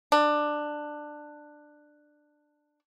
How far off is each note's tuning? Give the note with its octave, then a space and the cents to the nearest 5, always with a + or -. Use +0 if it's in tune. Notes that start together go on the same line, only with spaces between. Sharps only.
D4 +15